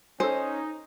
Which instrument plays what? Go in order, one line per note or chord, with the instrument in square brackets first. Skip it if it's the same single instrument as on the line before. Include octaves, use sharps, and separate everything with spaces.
[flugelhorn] C#4 [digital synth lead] D#4 [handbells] A4 G#5 [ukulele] C5